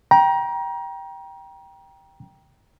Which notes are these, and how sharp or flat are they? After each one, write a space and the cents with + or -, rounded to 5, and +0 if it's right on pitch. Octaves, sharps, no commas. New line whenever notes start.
G5 +0 A#5 +30